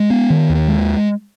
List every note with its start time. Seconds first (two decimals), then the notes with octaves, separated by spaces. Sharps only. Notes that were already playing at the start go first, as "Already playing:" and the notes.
Already playing: G#3
0.10 B3
0.30 D#3
0.49 D#2
0.68 G#3